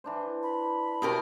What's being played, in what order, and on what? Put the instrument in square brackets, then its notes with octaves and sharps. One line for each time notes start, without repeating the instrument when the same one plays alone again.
[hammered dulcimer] E3 D4 C5
[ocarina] B5
[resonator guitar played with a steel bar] B2 G4 A#4 [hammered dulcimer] C4 E4